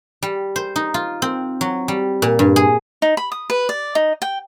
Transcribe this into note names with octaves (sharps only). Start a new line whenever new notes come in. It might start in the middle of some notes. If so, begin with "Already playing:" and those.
G3
C5
D#4
F4
C4
F#3
G3
A#2
G2
G#4
D#4
B5
D#6
B4
D5
D#4
G5